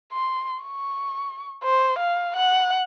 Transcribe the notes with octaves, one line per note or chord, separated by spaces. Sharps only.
C6
C#6
C5
F5
F#5